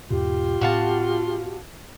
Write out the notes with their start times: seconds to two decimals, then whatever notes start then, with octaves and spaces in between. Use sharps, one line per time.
0.11 E2 G#2 B2 F4 G4
0.61 A2 C4 F#4 F5 A5